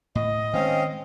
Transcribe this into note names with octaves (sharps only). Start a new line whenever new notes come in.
A2 D#5
D#3 G#3 C4 C#4 F5